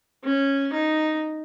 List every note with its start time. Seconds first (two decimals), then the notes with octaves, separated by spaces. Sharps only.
0.24 C#4
0.73 D#4